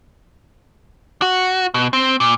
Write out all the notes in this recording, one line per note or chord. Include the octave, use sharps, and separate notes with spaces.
F#4
B2
C4
A#2